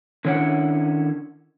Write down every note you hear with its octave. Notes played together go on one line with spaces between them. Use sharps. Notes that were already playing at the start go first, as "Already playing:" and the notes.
D3 D#3 C#4 E4 C#5 F#5